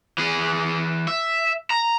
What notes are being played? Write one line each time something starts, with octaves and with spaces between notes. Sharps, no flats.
E3 G#4
E5
A#5